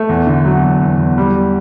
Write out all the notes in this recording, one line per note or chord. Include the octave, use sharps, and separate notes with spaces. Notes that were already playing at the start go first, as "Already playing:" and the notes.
Already playing: A3
E2
D3
F#3
E2
E2
E2
G3